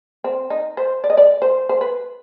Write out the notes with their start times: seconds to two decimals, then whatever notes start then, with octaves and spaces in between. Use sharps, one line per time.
0.24 C4
0.50 D#4
0.77 C5
1.04 D5
1.10 D#5
1.17 D5
1.42 C5
1.69 C5
1.81 B4